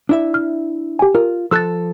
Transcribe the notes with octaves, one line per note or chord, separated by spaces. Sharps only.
D4 E4 E5
F6
G4 G5 G#5
F4 A#4
F3 A4 E6 F#6 A6